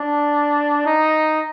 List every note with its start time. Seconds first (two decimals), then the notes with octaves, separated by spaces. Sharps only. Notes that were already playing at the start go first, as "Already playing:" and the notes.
Already playing: D4
0.85 D#4